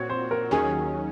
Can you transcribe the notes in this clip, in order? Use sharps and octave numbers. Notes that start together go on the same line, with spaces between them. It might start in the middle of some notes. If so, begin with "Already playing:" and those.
Already playing: A#2 C4 F#4 C#5
C5
A#4
D#2 D#3 F#3 C#4 G#4